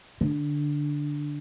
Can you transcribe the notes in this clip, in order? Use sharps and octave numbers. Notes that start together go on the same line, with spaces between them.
D3